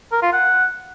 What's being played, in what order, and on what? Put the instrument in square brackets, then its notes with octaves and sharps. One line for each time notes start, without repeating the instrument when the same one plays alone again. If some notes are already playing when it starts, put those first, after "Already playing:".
[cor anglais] A#4
F4
F#5